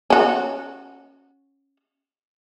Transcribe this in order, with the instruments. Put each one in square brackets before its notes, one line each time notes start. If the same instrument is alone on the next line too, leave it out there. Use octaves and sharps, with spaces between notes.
[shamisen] C#4 F#4